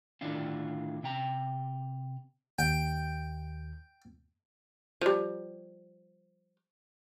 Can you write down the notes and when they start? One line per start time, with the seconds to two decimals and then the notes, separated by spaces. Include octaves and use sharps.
0.21 A2 D3 D#3 D4 E4 F4
1.03 C3 G5 A#5
2.59 D#2 G5
5.01 F3 G3